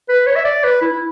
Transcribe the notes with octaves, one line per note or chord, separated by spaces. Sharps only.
B4
C#5
E5
D5
B4
E4
E4